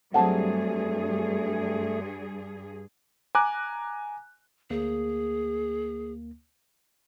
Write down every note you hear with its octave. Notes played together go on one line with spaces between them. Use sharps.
G2 F#3 G3 A3 C4 G#4 F#5 A5
G#5 A#5 D6 F#6
D2 A#3 G#4